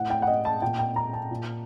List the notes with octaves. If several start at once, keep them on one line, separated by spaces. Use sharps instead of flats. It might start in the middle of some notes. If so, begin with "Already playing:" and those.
Already playing: A2 F#5
G5
F#5
D#5
A5
A#2 G5
G5
A#5
A5
A#2